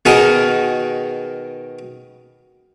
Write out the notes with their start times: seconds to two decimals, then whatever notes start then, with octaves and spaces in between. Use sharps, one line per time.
0.05 B2 D#3 D#4 F#4 G#4 A#4